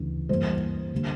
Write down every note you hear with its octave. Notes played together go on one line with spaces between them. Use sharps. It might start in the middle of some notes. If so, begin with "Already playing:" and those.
Already playing: D2 C#3 E3
G2 E3 G3 A#3 C5
D3 G3 A#3